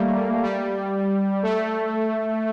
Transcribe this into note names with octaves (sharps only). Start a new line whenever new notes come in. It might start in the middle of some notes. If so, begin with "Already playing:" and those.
Already playing: G3 A3 A#3
G3
G3
A3